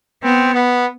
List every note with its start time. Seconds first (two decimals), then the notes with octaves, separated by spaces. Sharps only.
0.23 B3 C4
0.54 B3